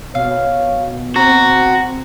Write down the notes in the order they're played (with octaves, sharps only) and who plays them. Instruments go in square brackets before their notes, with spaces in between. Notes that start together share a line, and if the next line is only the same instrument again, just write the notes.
[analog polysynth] B2 [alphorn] C#5 [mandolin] F5
[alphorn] C4 [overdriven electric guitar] F#4 [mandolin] A#5